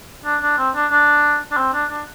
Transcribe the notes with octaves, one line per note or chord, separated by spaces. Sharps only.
D4
D4
C4
D4
D4
D4
C4
D4
D4